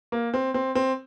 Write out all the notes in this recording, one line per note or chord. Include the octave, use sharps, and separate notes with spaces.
A#3
C4
C4
C4